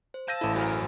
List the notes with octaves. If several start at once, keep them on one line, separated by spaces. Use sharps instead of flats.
C5
F5 A5 E6 G6 A#6 D#7
A1 E4 A4
F#3 A#4 C5 G#5 B5